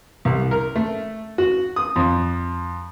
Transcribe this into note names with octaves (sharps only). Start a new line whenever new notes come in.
C2
A#4
A3
F#4
D#6
F2